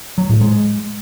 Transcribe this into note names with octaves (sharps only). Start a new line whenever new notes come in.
F#3
A2
G#3